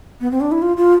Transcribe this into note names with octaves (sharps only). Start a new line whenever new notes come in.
B3
C4
D4
E4
F4
F4